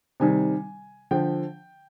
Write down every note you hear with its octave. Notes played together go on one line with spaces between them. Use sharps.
C3 D#3 G3 G#5
D3 F3 G5